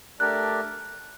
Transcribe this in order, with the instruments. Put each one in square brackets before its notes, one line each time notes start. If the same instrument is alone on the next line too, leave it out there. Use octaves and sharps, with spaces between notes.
[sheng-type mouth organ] A3 D4 G4 A#4 D5 [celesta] F#6